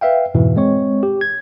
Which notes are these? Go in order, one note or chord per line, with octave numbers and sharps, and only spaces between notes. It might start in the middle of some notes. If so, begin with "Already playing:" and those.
B4 E5 F5 G5
F2 G#2 B2 E3
G#3 C4 C#5 C#6
G4
G#6